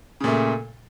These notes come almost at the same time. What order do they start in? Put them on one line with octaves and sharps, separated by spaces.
C#3 A#2 A3